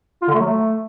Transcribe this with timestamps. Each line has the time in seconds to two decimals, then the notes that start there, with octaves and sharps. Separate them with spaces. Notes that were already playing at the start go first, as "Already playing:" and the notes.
0.22 F4
0.28 D3
0.34 A3
0.40 F#3
0.46 A3